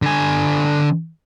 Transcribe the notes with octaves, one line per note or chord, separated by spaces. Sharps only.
D3 G#5